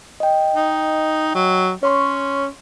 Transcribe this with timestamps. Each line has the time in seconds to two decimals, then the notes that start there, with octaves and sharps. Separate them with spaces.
0.20 D#5 G5
0.55 D#4
1.35 F#3
1.83 C#4 C#5 C6 C#6